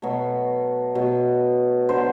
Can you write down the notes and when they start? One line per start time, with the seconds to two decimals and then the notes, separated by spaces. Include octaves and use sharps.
0.02 B2 F#3 A3
0.95 B2 F#3 A3
1.89 D3 F#3 B3 C5